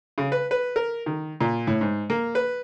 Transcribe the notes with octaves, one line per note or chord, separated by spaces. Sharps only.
C#3
B4
B4
A#4
D#3
A#2
A2
G#2
A#3
B4